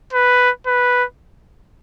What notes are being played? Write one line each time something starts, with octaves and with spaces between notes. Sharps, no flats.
B4
B4